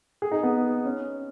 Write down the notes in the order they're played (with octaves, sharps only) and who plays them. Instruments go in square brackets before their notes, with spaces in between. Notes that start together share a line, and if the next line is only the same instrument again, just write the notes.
[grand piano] G#4
D#4
B3
C#4